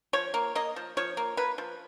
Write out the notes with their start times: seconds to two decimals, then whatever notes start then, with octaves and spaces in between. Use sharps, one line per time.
0.13 F3 C#5
0.34 A#3
0.55 A#3 D#5
0.76 F3
0.97 F3 C#5
1.17 A#3
1.37 A#3 B4
1.58 F3